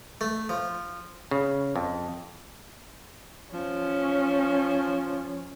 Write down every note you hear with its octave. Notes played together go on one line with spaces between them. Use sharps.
A3
F3
C#3
F2
F3 C#4